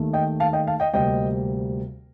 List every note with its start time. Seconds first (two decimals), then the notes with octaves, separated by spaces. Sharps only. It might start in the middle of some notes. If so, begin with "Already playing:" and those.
Already playing: D#2 D#3 A3
0.13 D#5 G5
0.40 F5 A5
0.53 D#5 G5
0.67 F5 A5
0.80 D#5 G5
0.94 D2 C3 G3 A#3 D#5 G5